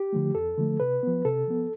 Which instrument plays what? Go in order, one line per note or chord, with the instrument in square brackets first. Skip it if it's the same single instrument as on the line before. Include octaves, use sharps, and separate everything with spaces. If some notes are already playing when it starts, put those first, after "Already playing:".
Already playing: [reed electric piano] G4
D3 F3 A3
F2 A4
D3 F3 A3
C3 B4
F3 B3
C3 A4
F3 B3